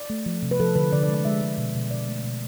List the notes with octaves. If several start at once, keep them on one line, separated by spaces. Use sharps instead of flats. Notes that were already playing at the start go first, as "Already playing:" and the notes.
Already playing: D5
A3
F3
C3
B4
F3 A4
D3 B4
D3 D5
D5
G#3
D5
G#3 E5
G#3
B2
B2
B2 D5
A3
B2